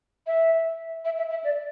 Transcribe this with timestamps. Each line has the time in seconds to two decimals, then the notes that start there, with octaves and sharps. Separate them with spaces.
0.27 E5
1.05 E5
1.18 E5
1.30 E5
1.44 D5